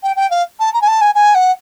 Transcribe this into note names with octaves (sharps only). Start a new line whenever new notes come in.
G5
G5
F5
A5
A#5
G#5
A5
G#5
G#5
F#5